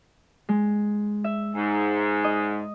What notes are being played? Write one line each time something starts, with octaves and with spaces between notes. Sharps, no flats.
G#3
E5
G#2
D#5